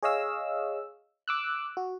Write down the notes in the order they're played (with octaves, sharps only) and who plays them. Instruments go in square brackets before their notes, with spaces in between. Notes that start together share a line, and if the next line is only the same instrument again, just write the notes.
[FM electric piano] G#4 C#5 D#5 F5 E6
D6 E6 F#6
F#4